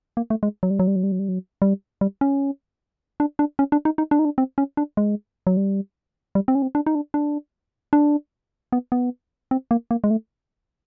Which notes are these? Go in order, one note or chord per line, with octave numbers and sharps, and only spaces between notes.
A#3
A3
G#3
F#3
G3
F#3
G3
F#3
G3
F#3
G3
F#3
G3
G3
C#4
D4
D4
C#4
D4
D#4
D#4
D4
D#4
D4
C4
C#4
D4
G#3
F#3
G3
G3
C4
C#4
C4
D4
D#4
D4
D4
D4
B3
B3
C4
A#3
A#3
G#3
A3